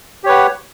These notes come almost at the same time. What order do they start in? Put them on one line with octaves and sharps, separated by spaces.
G4 C#5 B4 F#5